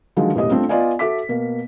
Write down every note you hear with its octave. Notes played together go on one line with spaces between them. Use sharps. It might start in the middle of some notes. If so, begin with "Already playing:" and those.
D3 D#3 F3 F#3 G#3
E1 A2 A#3 G4 D#5 D#6
A3 C4 D4 F4
B3 F4 D5 D#5 G#5
F#4 A4 E5 D6 B6
B2 A#3